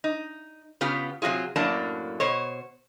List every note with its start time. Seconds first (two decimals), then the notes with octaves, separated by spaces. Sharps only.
0.04 D#4
0.81 C#3 B3 F4 G4
1.22 C3 F3 F#3 F4 G#4
1.56 F#2 A2 F#3 A#3 D4 A5
2.20 B2 C5 C#5